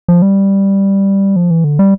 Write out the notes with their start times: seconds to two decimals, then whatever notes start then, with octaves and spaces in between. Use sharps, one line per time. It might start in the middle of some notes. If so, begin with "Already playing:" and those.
0.08 F3
0.22 G3
1.36 F3
1.51 E3
1.64 D3
1.79 G3